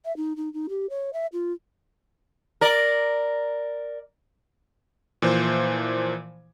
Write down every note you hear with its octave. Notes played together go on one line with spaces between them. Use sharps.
E5
D#4
D#4
D#4
G4
C#5
E5
F4
A#4 D5
A#2 E3 F3 C5